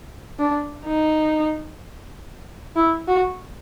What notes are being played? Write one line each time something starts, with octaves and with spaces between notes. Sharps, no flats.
D4
D#4
E4
F#4